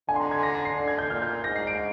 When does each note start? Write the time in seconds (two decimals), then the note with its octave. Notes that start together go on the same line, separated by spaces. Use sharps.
0.09 D3 G#5
0.16 C6
0.20 A#5
0.31 G#6
0.43 A#6
0.54 A#6
0.65 C7
0.77 D3 C7
0.88 G#6
0.99 G6
1.10 A#2 F6
1.22 G6
1.44 G#2 A#6
1.56 C7
1.67 D7